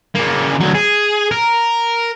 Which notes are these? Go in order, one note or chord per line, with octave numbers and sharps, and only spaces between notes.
C#3 A#3
D2 F#3
G#4
A#4